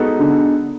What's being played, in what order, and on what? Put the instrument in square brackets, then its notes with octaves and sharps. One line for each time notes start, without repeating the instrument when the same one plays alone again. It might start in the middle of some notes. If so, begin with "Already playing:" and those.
Already playing: [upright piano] G#3 B3 D#4 F#4 A4
[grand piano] D3